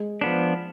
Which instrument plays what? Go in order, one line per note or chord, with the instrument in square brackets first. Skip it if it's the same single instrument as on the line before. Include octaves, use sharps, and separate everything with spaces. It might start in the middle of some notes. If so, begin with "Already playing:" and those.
Already playing: [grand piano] G#3
[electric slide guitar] F3 B3 D4